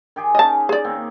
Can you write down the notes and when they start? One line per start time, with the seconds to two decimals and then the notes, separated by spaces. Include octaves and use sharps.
0.16 D#3 G4 G#4
0.35 C#4 D#4 D#5 A5
0.69 G#4 D5
0.84 D#3 A#3 C4